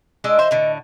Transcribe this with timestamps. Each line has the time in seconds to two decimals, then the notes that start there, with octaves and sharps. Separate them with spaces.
0.24 G#3 D4 D#5 E6
0.39 E3 C5 D#5 E5
0.51 A2 D3